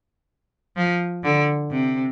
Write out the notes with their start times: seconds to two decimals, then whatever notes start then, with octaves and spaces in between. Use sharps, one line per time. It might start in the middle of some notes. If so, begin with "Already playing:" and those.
0.77 F3
1.24 D3
1.71 C3